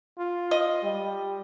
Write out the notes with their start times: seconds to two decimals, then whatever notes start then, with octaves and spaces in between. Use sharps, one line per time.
0.18 F4
0.51 D#5
0.83 G3